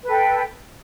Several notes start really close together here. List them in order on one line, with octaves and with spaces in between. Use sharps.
B4 A4 G5